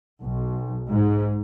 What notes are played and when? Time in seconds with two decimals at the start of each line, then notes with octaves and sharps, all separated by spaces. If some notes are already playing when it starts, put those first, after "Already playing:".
0.22 B1
0.90 G#2